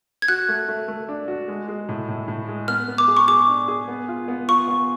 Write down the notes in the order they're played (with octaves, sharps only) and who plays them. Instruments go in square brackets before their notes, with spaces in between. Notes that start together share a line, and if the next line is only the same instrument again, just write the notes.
[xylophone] G#6
[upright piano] F#4 [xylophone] F#6
[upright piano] A3
A3
A3
D4
F#4
G#3
G#3
A2
A2
A2
G#3
[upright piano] B3 [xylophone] F6
[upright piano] B3
[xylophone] D6
[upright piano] G#4
[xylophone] C#6
[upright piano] G#4 [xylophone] D6
[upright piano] D4
G#4
B3
F4
B3
[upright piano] F4 [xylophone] C#6
[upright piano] B3